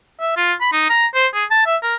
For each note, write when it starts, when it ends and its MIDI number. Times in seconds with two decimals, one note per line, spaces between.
0.21 0.36 76
0.36 0.53 65
0.61 0.72 83
0.72 0.87 63
0.89 1.07 82
1.15 1.27 72
1.34 1.45 68
1.51 1.63 81
1.66 1.77 76
1.83 1.95 70